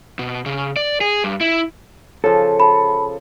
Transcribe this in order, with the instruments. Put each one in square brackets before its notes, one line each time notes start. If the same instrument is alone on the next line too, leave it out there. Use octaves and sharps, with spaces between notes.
[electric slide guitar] B2
C#3
D5
G#4
G2
E4
[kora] C#3 F3 [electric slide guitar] A4
[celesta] A5 B5